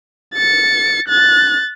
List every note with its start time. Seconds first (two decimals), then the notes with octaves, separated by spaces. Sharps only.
0.34 A6 C#7
1.08 F#6 A6